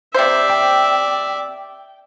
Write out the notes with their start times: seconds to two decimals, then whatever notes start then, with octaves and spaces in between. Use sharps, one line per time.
0.14 C3 C5 D5 E5
0.50 G5